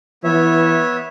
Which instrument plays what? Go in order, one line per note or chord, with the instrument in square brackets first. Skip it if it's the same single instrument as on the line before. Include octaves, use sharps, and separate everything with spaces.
[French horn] E3 [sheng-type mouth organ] B3 C#5 E5